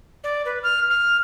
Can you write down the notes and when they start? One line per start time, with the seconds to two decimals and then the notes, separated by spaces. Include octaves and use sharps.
0.24 D5
0.45 B4
0.63 F6
0.90 F6